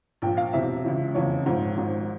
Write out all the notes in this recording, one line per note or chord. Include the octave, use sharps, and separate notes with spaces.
A#1 A#2 F3 G5
F5
E1 E2 C3 E3 E5
C#2 C#3 E3
F1 E2 C#3 F3 C#5
A#1 G#2 F3
G#1 G#2 F3